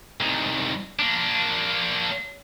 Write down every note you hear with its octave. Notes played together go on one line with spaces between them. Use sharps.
C2 D#3
A#3 D4